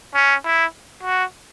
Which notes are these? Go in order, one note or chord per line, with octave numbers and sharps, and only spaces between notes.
C#4
E4
F#4